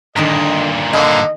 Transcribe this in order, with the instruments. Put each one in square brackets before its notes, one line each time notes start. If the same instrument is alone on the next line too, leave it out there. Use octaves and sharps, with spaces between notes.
[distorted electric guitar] G2 A#2 [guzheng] D3 D#3 A#4 [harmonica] D#5
[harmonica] D3 A#3 [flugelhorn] D#5 [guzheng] G#5 B5